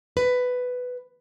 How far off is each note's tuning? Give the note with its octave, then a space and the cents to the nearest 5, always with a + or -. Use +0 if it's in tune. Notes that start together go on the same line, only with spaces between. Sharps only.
B4 +10